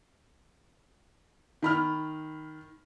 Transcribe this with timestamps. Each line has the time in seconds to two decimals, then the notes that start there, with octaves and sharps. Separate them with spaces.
1.62 D#3 B5 F6